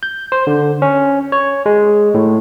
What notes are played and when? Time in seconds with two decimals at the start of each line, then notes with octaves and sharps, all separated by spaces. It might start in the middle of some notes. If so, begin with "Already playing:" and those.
0.03 G6
0.32 C5
0.47 D3
0.82 C#4
1.32 C#5
1.66 G#3
2.14 A2